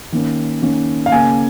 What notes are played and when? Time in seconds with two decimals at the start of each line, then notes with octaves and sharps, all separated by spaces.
0.12 D#3 A#3 C#4
0.62 D#3 A#3 C#4
1.06 F5
1.12 C#3 A#3 C#4 G#5